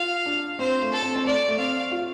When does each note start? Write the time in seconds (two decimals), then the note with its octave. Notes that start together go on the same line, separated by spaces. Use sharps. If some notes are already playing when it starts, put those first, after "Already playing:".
Already playing: F4 F5
0.26 D4
0.59 C4 C5
0.81 A3
0.92 A4
1.03 C4
1.16 C4
1.25 A3 D5
1.48 A3
1.58 C4 F5
1.91 F4